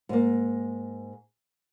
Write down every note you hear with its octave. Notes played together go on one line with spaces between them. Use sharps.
G#2 A#3